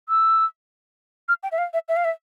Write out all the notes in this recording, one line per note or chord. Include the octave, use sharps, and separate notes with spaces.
E6
F6
G5
E5
F5
E5
E5
F5
E5